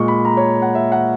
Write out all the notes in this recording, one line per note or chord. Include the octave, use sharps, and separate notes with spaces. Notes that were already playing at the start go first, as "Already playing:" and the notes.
Already playing: A#2 G#3 C#6
B5
A#5
C#5
F#5
E5
F#5